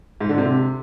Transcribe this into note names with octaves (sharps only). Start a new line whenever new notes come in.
G#2
D3
C3